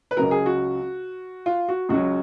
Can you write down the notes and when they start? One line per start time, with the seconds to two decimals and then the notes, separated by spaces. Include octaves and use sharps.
0.11 B4
0.17 C#2 C#3 F#3 A#4
0.31 G#4
0.46 F#4
1.46 F4
1.69 F#4
1.89 C#2 C#3 F#3 F#4